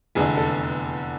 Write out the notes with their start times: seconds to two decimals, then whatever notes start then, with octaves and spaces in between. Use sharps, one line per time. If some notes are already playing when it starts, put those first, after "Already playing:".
0.15 F1 E2 D3 G#4
0.37 A4